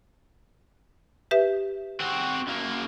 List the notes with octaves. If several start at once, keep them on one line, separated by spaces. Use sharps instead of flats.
G4 B4 E5
C4 F#4
F#2 A#3